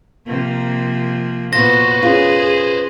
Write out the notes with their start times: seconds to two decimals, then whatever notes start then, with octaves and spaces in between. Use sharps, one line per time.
0.27 C3 F3 A#3
1.53 A#2 B3 F4 F#4 B4 C5 A#6
2.03 C#4 F4 G#4